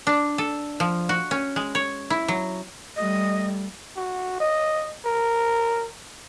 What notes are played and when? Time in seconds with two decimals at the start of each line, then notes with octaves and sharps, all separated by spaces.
0.07 D4
0.38 A4
0.80 F3
1.09 F#4
1.31 C#4
1.56 G#3
1.75 C#5
2.10 E4
2.28 F#3
2.96 G3 A3 D#5
3.96 F#4
4.40 D#5
5.05 A#4